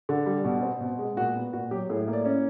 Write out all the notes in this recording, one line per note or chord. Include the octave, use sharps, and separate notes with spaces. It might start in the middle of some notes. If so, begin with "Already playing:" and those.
D3
G3
B2
C4
B2
G#3
A#2 F#4
B3
A#2 F#4
F#3 G4
A2 G#4
A#3
D5
C#4